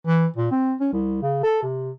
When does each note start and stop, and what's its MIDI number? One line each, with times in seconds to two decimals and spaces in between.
0.07 0.26 52
0.37 0.50 46
0.52 0.75 60
0.80 0.89 61
0.93 1.20 36
1.22 1.43 49
1.43 1.63 69
1.63 1.91 48